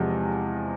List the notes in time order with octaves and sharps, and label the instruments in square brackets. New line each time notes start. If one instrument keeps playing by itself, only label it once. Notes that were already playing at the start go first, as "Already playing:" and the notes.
Already playing: [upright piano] E2 C3 F3 G#3